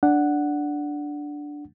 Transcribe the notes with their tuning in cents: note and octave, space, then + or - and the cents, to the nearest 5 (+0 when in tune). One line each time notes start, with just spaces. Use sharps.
D4 +0 F#5 +0